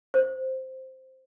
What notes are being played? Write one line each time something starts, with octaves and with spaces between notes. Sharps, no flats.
C5